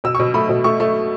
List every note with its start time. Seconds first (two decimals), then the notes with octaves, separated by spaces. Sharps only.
0.04 B2 E6
0.15 C#6
0.20 B2
0.34 A3 B5
0.49 B2
0.64 A3 C#6
0.80 A3